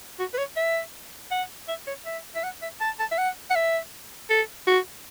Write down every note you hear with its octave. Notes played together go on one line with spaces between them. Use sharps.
F#4
B4
C#5
E5
F#5
E5
C#5
E5
E5
F#5
E5
A5
A5
E5
F#5
F#5
E5
A4
F#4